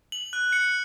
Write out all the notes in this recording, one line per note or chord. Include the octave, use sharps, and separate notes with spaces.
F#7
F#6
C#7